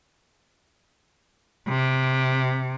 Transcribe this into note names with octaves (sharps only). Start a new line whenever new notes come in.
C3